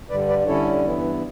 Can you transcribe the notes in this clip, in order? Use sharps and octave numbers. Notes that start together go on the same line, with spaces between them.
G2 D3 G3 B4 D5
B4 D5
D3 G3 C#4 E4 A4 C#5
G2 E3 B3 E4